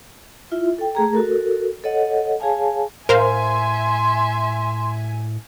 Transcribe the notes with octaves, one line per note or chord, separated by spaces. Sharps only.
E4 F4 E5
A4 G5
A3 G#4 A#5
F#4 A4 A#4
A4 C#5 D#5 F#5
G#4 C#5 F5 G#5 A5
A2 A#4 C5 E5 F5 G#5 C6